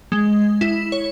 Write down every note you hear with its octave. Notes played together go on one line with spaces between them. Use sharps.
G#3
E4
C#5